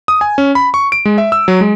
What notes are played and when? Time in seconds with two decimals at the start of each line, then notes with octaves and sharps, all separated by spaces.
0.08 D#6
0.21 G#5
0.38 C#4
0.55 B5
0.74 C#6
0.92 D7
1.05 G#3
1.18 E5
1.32 E6
1.48 F#3
1.61 G#3